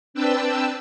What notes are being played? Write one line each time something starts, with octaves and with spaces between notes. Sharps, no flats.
C4 D4 B4 G5 A5 E6